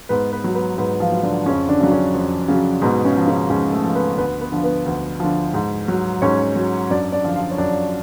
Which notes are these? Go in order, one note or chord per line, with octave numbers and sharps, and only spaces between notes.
G#2 B3 B4
B3 B4
F#3
B3 B4
G#2 B3 B4
F3 F4
F#3
D3 D4
F2 C#3 C#4
D3 D4
C#3
F#3
C#3 C#4
F2
C#3 F#3
G#2 B2 B3
C#3 C#4
F3
C#3 C#4
G#2 C#3 C#4
A3 A4
F3
B3 B4
D2 B3 B4
B3 B4
D3 F3
B3 B4
D2
D3 F3
G#2
F#3
G#2 C#4 C#5
F#3
F#2 D4 D5
D4 D5
D3 F3
F4 F5
C#5
F#2 D4 D5